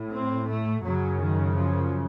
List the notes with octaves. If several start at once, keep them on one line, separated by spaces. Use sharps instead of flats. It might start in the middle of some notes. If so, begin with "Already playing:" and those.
Already playing: A2
C4
A3
F#2 C#3 F#3
D#3
F3